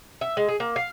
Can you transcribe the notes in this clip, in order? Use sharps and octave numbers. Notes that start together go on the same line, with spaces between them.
E5
G#3
G#4
A#3
F5